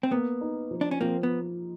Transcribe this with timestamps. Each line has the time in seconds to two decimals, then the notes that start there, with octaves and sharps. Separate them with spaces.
0.03 C4
0.12 A#3 B3
0.41 D#4
0.71 F3
0.81 D4
0.91 C#4
1.01 F3 A#3 C4
1.23 B3